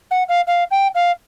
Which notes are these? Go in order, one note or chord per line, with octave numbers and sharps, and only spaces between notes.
F#5
F5
F5
G5
F5